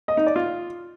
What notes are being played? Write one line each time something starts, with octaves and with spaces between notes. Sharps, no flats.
D#5
D#4
D5
F4